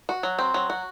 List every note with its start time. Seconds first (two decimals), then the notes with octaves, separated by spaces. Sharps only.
0.09 F#4
0.23 F#3
0.39 C4
0.54 F#3
0.70 F#4